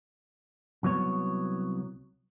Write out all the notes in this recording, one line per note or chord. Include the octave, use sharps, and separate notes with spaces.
C2 F#3 B3 C#5